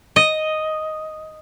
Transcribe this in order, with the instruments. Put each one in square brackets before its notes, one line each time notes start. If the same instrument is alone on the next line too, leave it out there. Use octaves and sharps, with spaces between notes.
[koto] D#5